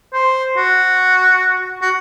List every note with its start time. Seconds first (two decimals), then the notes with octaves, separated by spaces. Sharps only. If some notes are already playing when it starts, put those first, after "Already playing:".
0.13 C5
0.57 F#4
1.82 F#4